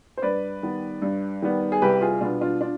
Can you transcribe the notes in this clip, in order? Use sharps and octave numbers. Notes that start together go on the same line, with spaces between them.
C5
G2 B4 D5
D#3 G3 B3
G2
D#3 G3 B3
G#4
C2 G4 B4
F4 G#4
B2 G3 B3 D4 F4
D4 F4
D4 F4